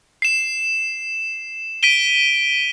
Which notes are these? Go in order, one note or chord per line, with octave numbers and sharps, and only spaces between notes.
C7 E7
B6 D7 D#7 G7